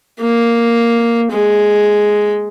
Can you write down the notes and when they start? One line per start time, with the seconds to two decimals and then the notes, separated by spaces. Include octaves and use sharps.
0.21 A#3
1.32 G#3